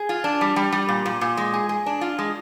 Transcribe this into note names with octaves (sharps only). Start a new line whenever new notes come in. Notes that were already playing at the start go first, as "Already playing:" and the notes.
Already playing: G#4
F4
D4
G3
G3
G3
A#2
A#2
A#2
G#3
G#4
G#4
D4
F4
G#3